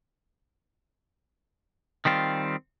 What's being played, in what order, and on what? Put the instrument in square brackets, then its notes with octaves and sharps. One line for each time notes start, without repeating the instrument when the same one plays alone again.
[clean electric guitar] D#3 G3 C4 F4